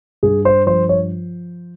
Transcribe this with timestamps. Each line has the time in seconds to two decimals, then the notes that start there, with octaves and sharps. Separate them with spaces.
0.23 G2 G#4
0.45 C5
0.67 F3 C5
0.89 C#5